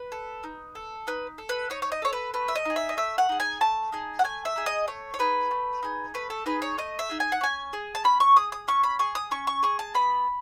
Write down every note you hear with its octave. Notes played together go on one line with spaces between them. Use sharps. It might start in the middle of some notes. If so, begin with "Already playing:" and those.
Already playing: B4
A4
D#4
A4
D#4 B4
A4
B4
D#4 C#5
C#5
D#5
A4 C#5
B4
A3 B4
E5
D#5
D#4 G#4
E5
D#5
A3 E5
F#5
D#4 G#4
G#5
A3 A5
D#4 G#4
F#5
A3 G#5
E5
D#4 G#4
D#5
A3 C#5
C#5
D#4 G#4 B4
A3
D#4 G#4
A3 B4
A4
D#4 G#4 B4
C#5
A3 D#5
E5
D#4 G#4
G#5
F#5
C#4 G#5
G#4
A5
C#4 B5
C#6
G#4 D#6
D#6
C#4 C#6
B5
G#4 C#6
D#6
C#4 C#6
C#6
G#4 C#6
A5
B3 B5